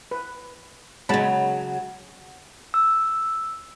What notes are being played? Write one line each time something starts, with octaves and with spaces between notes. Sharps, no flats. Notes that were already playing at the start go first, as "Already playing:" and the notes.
B4
C#3 F#3 G#3 A5 B5
E6